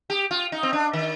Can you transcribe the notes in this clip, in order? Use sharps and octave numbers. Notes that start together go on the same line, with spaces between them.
G4
F4
D#4
C4
D4
D#3